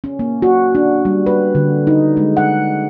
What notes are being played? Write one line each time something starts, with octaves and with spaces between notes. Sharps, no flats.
C#4
A#3
F#4
D4
G3
B4
D3
D#4
G#3
F#5